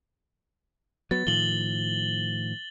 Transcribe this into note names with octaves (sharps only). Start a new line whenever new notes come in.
F#3 B3 A6
A2 D#3 F3 F#7 G7